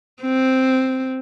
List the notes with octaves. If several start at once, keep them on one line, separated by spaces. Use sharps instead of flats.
C4